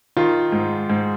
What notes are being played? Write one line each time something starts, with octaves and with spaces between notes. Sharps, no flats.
D#3 F4
G#2
G#2